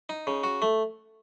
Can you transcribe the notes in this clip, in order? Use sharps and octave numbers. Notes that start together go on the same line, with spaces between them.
D#4
C#3
F#4
A3